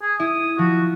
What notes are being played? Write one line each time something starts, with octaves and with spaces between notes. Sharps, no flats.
G#4
E4 D#6
F3 F#4